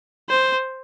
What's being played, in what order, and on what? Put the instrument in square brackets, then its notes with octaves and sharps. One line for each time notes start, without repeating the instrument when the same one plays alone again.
[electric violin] C5